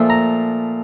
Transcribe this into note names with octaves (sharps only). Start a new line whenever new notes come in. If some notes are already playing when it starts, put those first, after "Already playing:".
Already playing: A#2 F3 A3
A#5